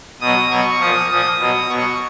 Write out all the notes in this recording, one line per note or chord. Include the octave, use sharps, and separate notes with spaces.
B2 F#3 D#6
B2 F#3 C#6
A#2 F3 D#6
A#2 F3 D#6
B2 F#3
B2 F#3 C#6